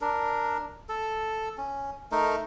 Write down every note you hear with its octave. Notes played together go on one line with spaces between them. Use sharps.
D4 A#4
A4
C#4
A3 D#4 A#4